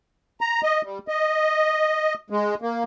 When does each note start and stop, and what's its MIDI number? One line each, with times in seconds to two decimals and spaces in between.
0.41 0.61 82
0.63 0.81 75
0.84 0.98 55
1.08 2.14 75
2.30 2.55 56
2.62 2.83 58